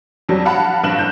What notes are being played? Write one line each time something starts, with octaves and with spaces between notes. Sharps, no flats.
F2 F#3 G3
F5 F#5 A5 B5
A#1 G2 F5 F#6 E7 F#7
F#1 G6 E7